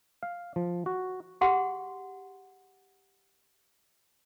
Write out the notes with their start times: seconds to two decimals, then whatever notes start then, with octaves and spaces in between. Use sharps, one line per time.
0.23 F5
0.56 F3
0.86 F#4
1.41 G4 G#4 F#5 C6